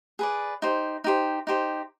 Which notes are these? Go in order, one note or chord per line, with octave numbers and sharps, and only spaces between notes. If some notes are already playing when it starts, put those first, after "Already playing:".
G#4 B4 D5
D#4 G4 C5
D#4 G4 C5
D#4 G4 C5